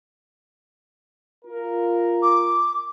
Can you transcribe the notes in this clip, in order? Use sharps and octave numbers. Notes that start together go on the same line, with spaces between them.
F4 A#4
D6